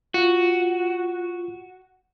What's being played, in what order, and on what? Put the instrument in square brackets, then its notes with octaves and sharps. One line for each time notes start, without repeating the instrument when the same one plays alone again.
[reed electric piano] F4 [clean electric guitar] F#4